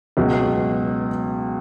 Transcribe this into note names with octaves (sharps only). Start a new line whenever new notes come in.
C#2 B2 F#3